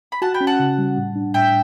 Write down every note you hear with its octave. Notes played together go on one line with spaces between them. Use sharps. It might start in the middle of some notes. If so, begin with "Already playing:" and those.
B5
F#4 F#5 A5
G5 B5
C#4
F#5 A5
C#3
G3
A2
D4
A2 E5 G5